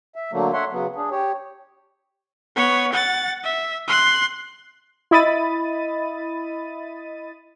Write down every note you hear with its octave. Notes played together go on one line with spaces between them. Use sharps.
E5
D3 F#3 A3 A#3
C#5 E5 F#5 C6
C#3 F#3 B3
D4 G#4
G4 C#5
B3 C#5
F#5 A6
E5
C6 F#6
E4 D#5 B5 A6 D#7